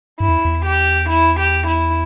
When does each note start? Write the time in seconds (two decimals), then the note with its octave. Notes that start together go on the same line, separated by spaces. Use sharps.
0.20 G2 E4
0.28 E2
0.45 E2
0.65 G4
1.09 E4
1.39 G4
1.68 E4